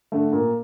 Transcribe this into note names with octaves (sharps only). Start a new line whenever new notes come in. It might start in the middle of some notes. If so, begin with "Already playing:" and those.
D3 A3
A#2